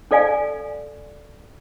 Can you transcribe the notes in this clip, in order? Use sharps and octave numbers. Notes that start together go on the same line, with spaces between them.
C#4 A4 D5 F5 G#5